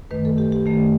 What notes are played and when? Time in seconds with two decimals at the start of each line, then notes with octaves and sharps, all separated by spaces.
0.11 F#2 D#3 A3 B4
0.25 A4
0.38 G4
0.52 G4
0.66 F#2 D#3 A3